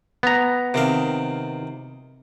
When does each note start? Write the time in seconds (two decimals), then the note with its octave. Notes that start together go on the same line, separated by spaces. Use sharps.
0.23 B3 A#5
0.74 C3 D#3 F5